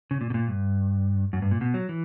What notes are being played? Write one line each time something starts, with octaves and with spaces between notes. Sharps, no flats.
C#3
A#2
B2
A#2
G2
F#2
G2
A#2
B2
F#3
E3